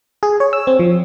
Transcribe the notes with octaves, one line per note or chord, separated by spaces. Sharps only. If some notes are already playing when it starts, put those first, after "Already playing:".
G#4
C#5
E6
C4
F3